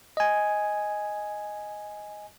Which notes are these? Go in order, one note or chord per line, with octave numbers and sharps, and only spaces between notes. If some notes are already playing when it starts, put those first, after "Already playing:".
D#5 G#5